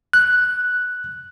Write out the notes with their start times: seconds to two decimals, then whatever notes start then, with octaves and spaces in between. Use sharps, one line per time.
0.13 F#6